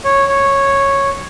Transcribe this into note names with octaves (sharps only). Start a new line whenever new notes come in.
C#5
C#5